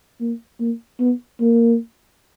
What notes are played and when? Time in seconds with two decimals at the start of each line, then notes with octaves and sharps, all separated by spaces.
0.20 A#3
0.60 A#3
0.99 B3
1.40 A#3